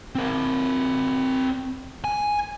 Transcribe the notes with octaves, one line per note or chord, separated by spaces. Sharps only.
C4 A#4
G#5